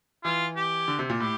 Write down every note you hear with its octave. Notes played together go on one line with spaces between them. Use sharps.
E3 F4
G4
D3
C3
A#2
A2 G4